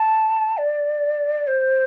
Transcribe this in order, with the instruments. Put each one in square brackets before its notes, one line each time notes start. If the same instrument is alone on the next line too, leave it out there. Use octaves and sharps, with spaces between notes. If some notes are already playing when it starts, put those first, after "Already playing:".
Already playing: [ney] A5
D5
C5